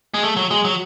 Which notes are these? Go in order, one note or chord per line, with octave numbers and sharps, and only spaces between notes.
G#3
A3
F#3
G#3
F#3